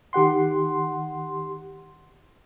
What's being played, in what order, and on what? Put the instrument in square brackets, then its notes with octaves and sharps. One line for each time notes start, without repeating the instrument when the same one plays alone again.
[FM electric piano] D#3 G4 F#5 C6